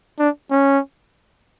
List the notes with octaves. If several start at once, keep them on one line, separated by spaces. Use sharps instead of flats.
D4
C#4